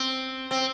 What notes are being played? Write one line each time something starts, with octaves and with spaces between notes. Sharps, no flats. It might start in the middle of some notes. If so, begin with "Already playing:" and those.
Already playing: C4
C4